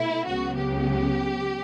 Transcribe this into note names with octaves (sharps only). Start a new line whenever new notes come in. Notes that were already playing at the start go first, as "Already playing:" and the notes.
Already playing: B2 A3 E4
C#2 C#3 F#3 B3 F#4
G4